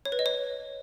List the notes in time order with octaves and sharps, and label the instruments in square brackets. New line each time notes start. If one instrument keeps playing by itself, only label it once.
[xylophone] C#5
B4
D#5
C#5